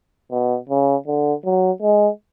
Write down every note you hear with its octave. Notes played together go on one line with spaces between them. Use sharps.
B2
C#3
D3
F#3
G#3